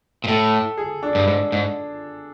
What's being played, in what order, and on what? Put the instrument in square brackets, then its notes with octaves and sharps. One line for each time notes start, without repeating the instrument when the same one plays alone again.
[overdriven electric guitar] A#2
[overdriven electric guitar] A2 [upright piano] A4
[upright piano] G#4
D4
[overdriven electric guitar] G2
G#2
G#2